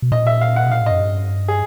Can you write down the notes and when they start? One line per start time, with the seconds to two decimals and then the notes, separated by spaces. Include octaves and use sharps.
0.02 B2
0.12 A#2 D#5
0.27 E5
0.41 F5
0.56 F#5
0.64 B2
0.71 A#2 F5
0.81 A2
0.86 F#2 D#5
1.00 G2
1.48 G#4